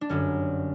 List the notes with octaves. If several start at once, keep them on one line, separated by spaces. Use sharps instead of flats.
D4
G1 F#2 D3 C#4